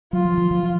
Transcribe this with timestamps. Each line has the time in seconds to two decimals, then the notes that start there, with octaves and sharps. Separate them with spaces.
0.13 F#3 F4
0.25 F3
0.38 F3
0.51 F3
0.63 F3